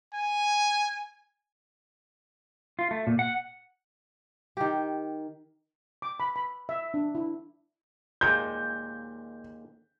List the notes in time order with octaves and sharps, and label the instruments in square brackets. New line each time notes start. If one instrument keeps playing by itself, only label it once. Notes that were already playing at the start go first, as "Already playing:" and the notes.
[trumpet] G#5
[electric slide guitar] F4
A3
A#2
F#5
[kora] D#3 G4
[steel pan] D6
B5
B5
E5
D4
E4
[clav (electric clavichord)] D#2 A#2 G#3 [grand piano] G6